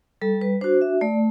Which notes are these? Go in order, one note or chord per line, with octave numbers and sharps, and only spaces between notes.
G3 A4
B4
D4 F#4 C5
E5
A3 D5